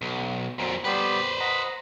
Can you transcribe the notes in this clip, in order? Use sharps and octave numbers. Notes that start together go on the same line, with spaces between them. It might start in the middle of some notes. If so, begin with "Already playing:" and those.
B1
F2 A#2 F#3 C4
G3 B3 G4 B4 C5
D#5 F#5 A#5